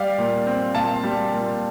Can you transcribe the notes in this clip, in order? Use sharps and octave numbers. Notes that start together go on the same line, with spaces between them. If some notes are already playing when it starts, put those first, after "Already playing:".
Already playing: G3 D5 F5
A#2
C4
A#2 F5 A5
G3
A#2